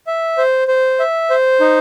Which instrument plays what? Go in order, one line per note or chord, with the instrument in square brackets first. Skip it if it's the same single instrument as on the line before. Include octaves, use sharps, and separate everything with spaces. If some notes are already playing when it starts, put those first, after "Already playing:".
[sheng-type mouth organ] E5
C5
C5
E5
C5
D#4